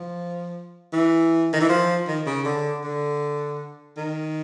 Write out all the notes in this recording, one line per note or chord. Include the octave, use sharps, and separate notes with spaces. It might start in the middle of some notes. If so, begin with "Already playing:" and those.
Already playing: F3
E3
D#3
E3
F3
D#3
C#3
D3
D3
D#3